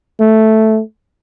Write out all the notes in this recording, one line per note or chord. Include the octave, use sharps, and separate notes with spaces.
A3